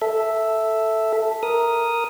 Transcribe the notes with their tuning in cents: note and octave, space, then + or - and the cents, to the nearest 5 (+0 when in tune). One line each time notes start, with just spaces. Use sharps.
A4 +0 E5 +0
A#4 +0 D#6 +0